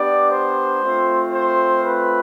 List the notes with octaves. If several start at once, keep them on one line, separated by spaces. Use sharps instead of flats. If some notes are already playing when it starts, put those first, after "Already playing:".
Already playing: B3 D4 G4 D5
C5
A3 C4 F4
C5
B4